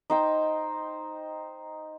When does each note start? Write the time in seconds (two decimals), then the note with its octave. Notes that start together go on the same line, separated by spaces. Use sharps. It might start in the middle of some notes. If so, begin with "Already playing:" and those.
0.10 D#4 C5 G5